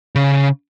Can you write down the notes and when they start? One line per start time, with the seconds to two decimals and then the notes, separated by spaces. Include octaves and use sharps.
0.15 C#3